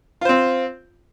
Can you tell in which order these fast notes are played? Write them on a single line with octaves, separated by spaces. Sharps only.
F4 C5 C4